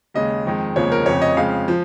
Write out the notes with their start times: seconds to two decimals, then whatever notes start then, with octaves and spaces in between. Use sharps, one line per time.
0.14 D#2 C#3 G#3 D#5
0.45 F2 D#3 G#3
0.76 F1 D#2 C#3 F3 G#3 C#5
0.92 A#4
1.06 F1 F2 C#3 C#5
1.22 D#5
1.37 F2 C#3 G#3 F5
1.68 F3